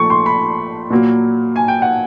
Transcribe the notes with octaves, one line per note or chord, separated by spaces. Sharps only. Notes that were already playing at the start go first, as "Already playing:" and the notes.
Already playing: A#2 F3 A3 C#6
C6
B5
A#2 F#3 A#3
G#5
G5
F#5